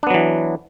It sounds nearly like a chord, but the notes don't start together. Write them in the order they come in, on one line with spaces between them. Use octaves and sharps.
D4 B3 F#3 E3